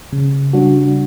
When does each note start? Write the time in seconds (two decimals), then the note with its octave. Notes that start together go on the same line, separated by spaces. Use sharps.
0.12 C#3
0.53 G3 D4 F#4